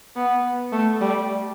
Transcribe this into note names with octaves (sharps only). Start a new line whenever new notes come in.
B3
A3
G3